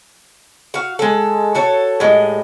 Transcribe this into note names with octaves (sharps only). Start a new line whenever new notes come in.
F#4 F5
G#3 A4
F#4 A4 C#5
A2 G3 G#3